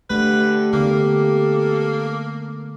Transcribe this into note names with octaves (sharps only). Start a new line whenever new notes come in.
D3 A3 G4 B4
D3 A#3 B3 A4